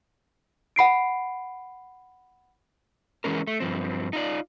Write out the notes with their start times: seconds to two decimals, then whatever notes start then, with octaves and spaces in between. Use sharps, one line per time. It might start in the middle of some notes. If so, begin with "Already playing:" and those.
0.76 F#5 B5 C7 D7
3.24 E3 G#3 C#4 A#4
3.47 A3
3.60 G2 F3 C4
4.13 D#4 F4 D5